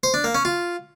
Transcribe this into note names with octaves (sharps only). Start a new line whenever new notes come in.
C5
D4
A#3
C#4
F4